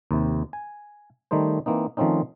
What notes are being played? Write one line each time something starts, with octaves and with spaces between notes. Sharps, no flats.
D#2 C3
G#5
D#3 G3 A3 D#4 C5
E3 A#3 C4 D#4
D#3 F3 A3 C4 C#4 D#4